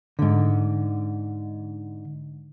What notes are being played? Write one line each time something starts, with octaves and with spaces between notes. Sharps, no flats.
G#2 D3